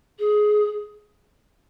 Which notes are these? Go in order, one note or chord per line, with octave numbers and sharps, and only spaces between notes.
G#4